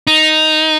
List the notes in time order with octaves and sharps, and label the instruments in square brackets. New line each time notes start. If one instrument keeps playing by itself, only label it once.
[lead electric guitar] D#4